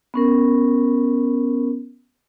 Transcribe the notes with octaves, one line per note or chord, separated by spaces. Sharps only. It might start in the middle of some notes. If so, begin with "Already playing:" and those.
B3 C#4 A#4